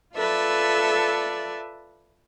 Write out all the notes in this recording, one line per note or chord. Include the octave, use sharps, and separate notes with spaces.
F4 A4 B4 D5 E5